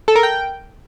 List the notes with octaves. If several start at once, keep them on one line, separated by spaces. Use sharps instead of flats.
A4
A#4
G5